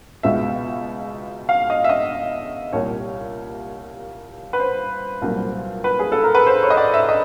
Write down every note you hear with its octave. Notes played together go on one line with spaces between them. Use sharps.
C#2 B2 G#3 E5
F5
D#5
E5
D#5
C2 A#2 G3 C#5
B4
C5
C2 A#2 F#3
B4
G#4
A4
A#4
B4
C5
C#5
D#5
D5
E5
D#5